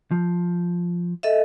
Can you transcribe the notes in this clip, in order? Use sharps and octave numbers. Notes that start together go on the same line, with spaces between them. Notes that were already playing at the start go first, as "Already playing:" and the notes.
F3
A4 D#5 E5